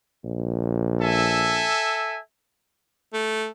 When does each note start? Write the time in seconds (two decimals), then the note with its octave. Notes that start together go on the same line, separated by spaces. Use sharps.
0.24 A#1
1.01 A4 E5 G#5
3.14 A3